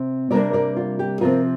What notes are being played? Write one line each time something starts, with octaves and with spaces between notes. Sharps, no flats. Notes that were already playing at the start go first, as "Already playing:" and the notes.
Already playing: C3 C4
C3 G3 A#3 D4 A#4 D5
A#4 D5
F4
G4
C3 F3 C4 F4 A#4